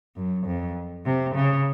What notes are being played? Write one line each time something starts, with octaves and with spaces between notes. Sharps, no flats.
F#2
F2
C3
C#3